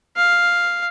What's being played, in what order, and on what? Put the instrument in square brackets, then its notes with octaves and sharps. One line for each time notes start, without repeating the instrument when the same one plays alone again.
[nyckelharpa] F5